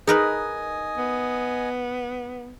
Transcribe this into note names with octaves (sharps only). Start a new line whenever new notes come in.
D#4 G#4 A#4 B4 D#5 G#5 D#6
B3